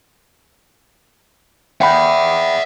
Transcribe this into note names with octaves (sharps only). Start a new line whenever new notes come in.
E5 F#5 G5 B5